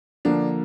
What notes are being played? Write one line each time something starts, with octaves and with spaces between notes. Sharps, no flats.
D3 F3 A#3 D4